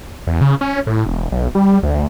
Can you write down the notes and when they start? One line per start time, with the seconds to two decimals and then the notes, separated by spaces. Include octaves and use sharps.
0.27 E2
0.41 C#3
0.61 C#4
0.87 A2
1.06 E1
1.31 B1
1.55 G3
1.83 D2